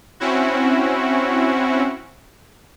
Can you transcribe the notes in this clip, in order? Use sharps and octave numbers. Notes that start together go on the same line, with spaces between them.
C4 C#4 E4 F#4